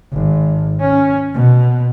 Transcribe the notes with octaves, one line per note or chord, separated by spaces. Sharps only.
G#1
C#4
B2